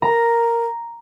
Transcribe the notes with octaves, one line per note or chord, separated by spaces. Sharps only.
A#4 A#5